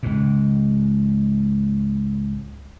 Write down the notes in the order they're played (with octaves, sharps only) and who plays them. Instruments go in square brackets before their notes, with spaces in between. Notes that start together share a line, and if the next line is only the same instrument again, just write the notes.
[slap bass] C#2 G#2